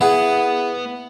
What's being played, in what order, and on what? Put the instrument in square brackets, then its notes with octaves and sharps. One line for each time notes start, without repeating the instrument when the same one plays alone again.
[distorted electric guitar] B3 [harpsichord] E4 G#4 [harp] F#5